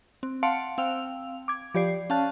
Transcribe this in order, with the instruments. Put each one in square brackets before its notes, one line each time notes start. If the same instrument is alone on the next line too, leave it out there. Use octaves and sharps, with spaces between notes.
[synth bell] C4
F5 F#5 A5 C6 C#7 D7
C4 F5 G5 E6 F7
D6 G#6
F3 G4 D5 C7
C#4 F5 A5 F#6